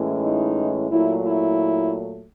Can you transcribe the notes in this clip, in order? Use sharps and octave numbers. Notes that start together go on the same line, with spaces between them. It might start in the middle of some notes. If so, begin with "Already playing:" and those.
Already playing: A2 E3 G#3 C#4
D#4
A#2 F#3 A3 E4
E4